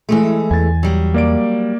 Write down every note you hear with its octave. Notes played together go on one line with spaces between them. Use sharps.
E3 G#3 A3
E2 G#5 A6
F#3 G3
A#3 D5 D7